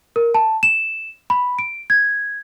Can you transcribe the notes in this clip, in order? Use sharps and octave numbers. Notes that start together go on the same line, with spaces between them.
A#4
A5
E7
B5
D7
G#6